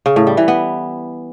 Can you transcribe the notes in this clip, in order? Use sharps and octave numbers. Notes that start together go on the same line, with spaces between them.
C#3
A2
G3
E3
B3